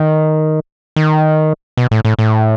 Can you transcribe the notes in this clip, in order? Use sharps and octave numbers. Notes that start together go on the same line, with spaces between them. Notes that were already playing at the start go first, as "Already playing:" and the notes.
Already playing: D#3
D#3
B2
A2
A2
A2